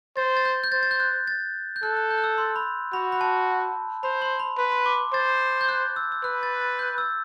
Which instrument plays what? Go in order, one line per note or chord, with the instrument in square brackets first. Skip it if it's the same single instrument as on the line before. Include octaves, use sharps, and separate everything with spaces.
[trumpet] C5 [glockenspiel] A6
[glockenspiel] A6
G6
G6
[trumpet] C5 [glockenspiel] A6
[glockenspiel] A6
G6
F#6
A6
G6
[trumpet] A4 [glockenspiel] F#6
[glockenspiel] F#6
G6
F#6
E6
C6
B5
[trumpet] F#4 [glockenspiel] B5
[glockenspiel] B5
A5
[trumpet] C5 [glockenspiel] B5
[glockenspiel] C6
B5
[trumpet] B4 [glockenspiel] C6
[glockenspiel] C6
D6
[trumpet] C5 [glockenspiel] A6
[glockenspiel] G6
F#6
E6
E6
[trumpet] B4 [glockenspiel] F#6
[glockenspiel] A6
A6
G6
E6